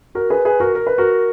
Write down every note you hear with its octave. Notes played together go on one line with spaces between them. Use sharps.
F#4 A#4
G#4 B4
G#4 B4
F#4 A#4
A#4
B4
F#4 A#4